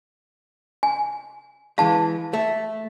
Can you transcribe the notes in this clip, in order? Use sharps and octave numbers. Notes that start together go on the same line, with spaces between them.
G#5
E3 G#3 F5 A5
A3